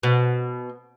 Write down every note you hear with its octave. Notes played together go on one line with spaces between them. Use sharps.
B2